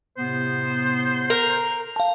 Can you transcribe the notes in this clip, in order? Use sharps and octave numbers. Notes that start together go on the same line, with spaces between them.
A2 C3 B3 C5
A#4
F5 A5